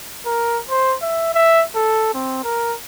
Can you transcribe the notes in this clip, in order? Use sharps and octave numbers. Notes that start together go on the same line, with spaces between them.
A#4
C5
E5
E5
A4
C4
A#4